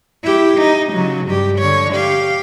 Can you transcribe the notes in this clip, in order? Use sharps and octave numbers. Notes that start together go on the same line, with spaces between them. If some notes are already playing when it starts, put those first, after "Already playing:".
E4 G4
D#4
C#3 F#3
G2 G4
D3 C#5
G4 F5